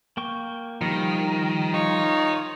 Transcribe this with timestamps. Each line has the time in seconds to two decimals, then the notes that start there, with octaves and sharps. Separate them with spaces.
0.17 A#3 G5 C#6
0.82 D#3 F3 G3
1.74 D#3 D#4 F4 C#5